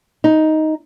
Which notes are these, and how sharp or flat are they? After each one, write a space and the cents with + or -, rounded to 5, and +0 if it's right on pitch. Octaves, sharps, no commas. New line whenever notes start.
D#4 +10